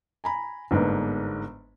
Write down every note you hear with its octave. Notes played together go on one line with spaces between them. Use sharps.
G#5 A#5 B5
G1 G#2 G#3 A#3 B3 D4